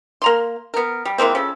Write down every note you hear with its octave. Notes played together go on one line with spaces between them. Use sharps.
A#3 A#5 C6
B3 A#4
G3
E3 G#3 A#3 C4
C#3 F3 A4